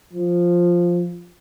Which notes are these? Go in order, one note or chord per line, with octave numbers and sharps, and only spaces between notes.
F3